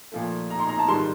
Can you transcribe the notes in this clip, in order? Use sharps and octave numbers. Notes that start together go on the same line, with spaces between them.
A#2 F3 A3
A#5
C6
A#5
A5
G#2 D#3 G3 C6